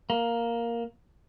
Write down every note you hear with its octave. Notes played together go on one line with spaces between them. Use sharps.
A#3